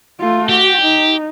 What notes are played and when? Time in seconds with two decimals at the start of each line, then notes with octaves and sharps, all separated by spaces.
0.20 A3 F4
0.49 F#4 G4
0.82 D#4